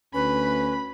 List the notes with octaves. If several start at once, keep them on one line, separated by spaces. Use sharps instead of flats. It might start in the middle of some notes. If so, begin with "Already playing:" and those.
D2 C#4 B4 B5